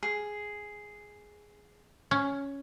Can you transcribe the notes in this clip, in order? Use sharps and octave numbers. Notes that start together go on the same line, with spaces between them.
G#4
C#4